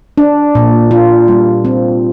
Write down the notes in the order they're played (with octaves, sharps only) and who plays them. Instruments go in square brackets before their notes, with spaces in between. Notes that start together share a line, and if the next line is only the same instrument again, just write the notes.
[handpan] D4
A#2
F4
G3
C4